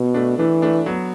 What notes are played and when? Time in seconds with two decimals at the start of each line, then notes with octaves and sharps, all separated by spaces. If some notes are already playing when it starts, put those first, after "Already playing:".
Already playing: B2
0.14 A3 D4
0.38 E3 A3 D4
0.62 A3 D4
0.86 F#3 B3